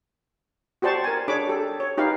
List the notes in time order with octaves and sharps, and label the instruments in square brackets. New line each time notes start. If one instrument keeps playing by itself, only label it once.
[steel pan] F#4 G4 C5 D5 A5 C#6
A#4 G#5
D4 G#4 C#5 B5 D6
G4 A4
C#5
D#4 G4 B4 F5